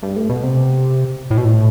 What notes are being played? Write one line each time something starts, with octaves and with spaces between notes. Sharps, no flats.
G2
A2
B2
C3
A2
B2
A2